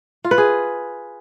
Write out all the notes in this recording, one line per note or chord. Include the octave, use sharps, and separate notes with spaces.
F4
B4
G#4